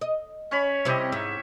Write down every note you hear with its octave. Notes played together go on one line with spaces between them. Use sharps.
D#5
C#4 C#5 B5
C3 G3 C4 E4 G4 D#5
G#2 E5